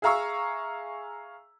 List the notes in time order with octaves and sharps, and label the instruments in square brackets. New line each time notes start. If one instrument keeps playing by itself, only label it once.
[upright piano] G#4 E5 F5 A#5 C#6 E6